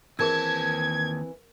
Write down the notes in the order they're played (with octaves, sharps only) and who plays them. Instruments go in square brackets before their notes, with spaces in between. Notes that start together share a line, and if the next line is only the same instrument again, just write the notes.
[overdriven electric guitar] D#2 A5 [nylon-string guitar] E3 C4 [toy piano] G#4 A#4 E6 [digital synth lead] G#6